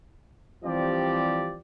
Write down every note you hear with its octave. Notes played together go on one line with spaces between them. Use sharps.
E3 F3 G3 C4 G4 D5